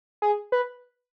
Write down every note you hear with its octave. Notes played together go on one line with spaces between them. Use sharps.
G#4
B4